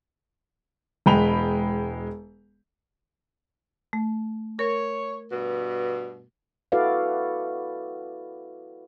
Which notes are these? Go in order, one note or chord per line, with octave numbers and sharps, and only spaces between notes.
E1 G#3 G5 B5 F7
A3
A#4 C#5
G2 B2
E4 F#4 A4 B4 D5 F5